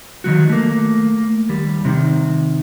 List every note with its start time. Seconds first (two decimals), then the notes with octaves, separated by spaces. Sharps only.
0.24 D#3 F3 F#3 F#4
0.49 A3 A#3
1.49 D#2 G3
1.85 C3 D#3